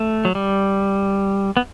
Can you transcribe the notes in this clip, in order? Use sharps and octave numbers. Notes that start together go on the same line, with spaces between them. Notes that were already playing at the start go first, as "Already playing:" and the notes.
Already playing: A3
F#3
G3
B3